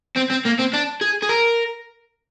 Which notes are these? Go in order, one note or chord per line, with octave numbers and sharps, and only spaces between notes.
C4
C4
A#3
C4
D4
G#4
G#4
A#4